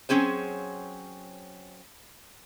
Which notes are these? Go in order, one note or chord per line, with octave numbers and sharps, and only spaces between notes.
F#3 C4 C#4 G#4 C5